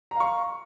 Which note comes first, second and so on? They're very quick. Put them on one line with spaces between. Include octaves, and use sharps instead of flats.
A#5 F5 C#6